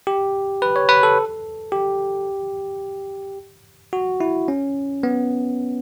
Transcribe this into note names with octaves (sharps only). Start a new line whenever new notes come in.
G4
B4
C#5
B4
A4
G4
F#4
E4
C#4
B3